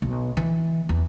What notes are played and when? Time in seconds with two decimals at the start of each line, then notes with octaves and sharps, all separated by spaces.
0.02 B1
0.37 E3
0.89 E2